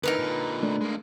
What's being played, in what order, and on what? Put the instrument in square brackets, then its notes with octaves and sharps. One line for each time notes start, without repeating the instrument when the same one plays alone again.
[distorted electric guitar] D2 E3 [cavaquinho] D#4 A#4 B4
[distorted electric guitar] A#2 D3
[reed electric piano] A3 D4
[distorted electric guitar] G#3 A#3